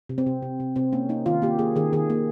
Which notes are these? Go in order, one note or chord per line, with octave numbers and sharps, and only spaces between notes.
C3
C4
C3
C3
C3
C3 C4
A#3 C#4
A#3 D#4
D#3 F4
A#3 G4
A#3 G#4
D#3 G#4
D#3 G#4
A#3